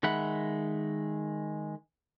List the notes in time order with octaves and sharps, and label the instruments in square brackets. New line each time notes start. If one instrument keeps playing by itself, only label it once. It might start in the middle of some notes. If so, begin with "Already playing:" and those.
[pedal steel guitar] D#3 G#3 E5 F#5 B5